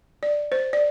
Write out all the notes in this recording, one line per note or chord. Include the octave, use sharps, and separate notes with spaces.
D5
C5
D5